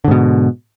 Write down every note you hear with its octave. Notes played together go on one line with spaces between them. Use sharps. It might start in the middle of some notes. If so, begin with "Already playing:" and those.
G#2 B2 D3